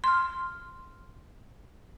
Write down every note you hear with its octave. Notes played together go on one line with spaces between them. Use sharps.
C6 F6